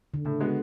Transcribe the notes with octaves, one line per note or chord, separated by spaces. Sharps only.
D3
A2 C#3
G#3 B3 F#4